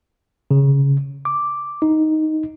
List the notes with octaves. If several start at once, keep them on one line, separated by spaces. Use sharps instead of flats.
C#3
D6
D#4